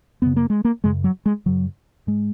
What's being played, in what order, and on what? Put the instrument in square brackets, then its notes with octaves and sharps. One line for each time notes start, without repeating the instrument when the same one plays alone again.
[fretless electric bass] F#2 C#3 B3
A#3
G#3
A#3
F#2 C#3 G#3
F#3
G#3
F#2 C#3 F#3
G#2 G#3